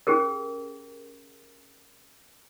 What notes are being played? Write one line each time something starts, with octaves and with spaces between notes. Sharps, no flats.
C#4 G4 G#4 A#4